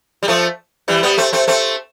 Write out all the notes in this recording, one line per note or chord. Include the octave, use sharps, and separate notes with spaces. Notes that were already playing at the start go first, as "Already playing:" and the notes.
G3
F3 A3
E3 G3
G3 B3
A3 C4
A3 C4
A3 C4